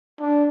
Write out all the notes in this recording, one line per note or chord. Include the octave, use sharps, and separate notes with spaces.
D4